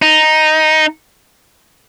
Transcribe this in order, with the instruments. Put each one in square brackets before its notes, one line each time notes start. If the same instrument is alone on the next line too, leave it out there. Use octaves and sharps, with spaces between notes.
[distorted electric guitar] D#4